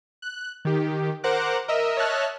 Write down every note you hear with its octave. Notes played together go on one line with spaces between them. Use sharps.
F#6
D#3 G4
A#4 C5 F#5 A#5 D6 F#6
A#4 D#5 E5
C#5 D#5 E5 A5 F6 F#6